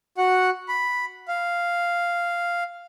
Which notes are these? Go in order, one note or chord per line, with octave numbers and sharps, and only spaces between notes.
F#4 F#5
B5
F5